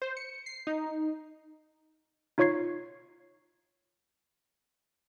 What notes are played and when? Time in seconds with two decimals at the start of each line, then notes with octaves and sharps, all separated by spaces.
0.02 C5
0.17 C#7
0.46 C7
0.67 D#4
2.38 D#4 F4 C#5 C#6 G#6 C7